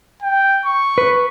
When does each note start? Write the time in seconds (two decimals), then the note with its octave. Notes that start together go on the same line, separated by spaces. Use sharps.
0.22 G5
0.65 C#6
0.98 B4